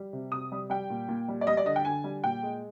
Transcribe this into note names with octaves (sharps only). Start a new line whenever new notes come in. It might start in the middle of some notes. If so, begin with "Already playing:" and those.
Already playing: G3
C3
C3 D#6
G3
G3 G5
A#2
A#2
G3
D5
G3 D#5
D5
D3 D#5
G5
D3 G#5
G3
A#2 G5
G#3